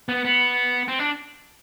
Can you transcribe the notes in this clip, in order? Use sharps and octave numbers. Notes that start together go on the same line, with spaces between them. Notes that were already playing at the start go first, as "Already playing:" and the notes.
B3
B3
C4
D4